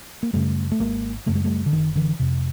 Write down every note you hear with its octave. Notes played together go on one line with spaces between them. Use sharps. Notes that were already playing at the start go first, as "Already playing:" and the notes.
A#3
F#2 C#3 G3 A3
A3
G#1 G#3 A#3
F#2 C#3 A3
G#3
G3 A3
D3
F#1 D#3
D3 E3
F2 C3